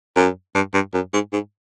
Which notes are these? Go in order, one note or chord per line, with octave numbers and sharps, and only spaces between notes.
F#2
G2
G2
F#2
G#2
G#2